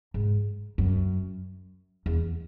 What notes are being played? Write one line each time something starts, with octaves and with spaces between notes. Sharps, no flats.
G#2
F#2
E2